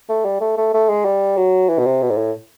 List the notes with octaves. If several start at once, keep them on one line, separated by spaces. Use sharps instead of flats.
A3
G3
A3
A3
A3
G#3
G3
F#3
E3
B2
C3
B2
G#2
A2